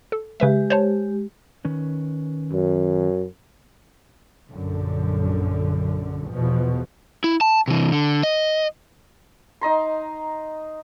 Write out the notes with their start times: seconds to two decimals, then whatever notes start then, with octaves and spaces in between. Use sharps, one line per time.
0.12 A4
0.40 C#3 G#3 G4 B4 E5
0.70 C5 C#5 A5
1.65 D#3 C#4 B4
2.53 F#2
4.49 A#1 F#2 D3
6.31 E2 B2 F3
7.24 E4
7.41 A5
7.68 C3 E3
7.92 D3
8.23 D#5
9.61 D#4 D#5 A#5 C6